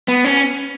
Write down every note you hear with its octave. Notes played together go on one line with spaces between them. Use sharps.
B3
C#4